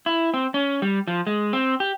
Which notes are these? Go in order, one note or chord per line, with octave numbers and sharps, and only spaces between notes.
E4
C4
C#4
G3
F3
G#3
C4
G4